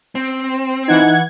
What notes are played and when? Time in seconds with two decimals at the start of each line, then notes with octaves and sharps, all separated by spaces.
0.15 C4
0.88 E3 D#4 F#5 G#6